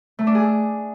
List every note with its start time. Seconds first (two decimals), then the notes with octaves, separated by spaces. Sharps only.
0.19 A3
0.27 D4
0.35 G#4